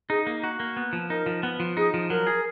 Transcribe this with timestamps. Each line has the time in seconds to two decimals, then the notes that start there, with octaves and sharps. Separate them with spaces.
0.10 D#4 G#4
0.27 A#3
0.44 F#4
0.60 A#3
0.77 B3
0.93 F3
1.10 D#4 A#4
1.26 F3
1.43 B3
1.60 F3
1.77 D#4 G#4
1.94 F3
2.10 F#3 A#4
2.27 G#4